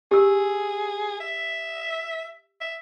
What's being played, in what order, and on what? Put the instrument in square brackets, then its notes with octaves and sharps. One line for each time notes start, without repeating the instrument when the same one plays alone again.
[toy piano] G4 E6 [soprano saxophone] G#4
[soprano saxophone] E5
E5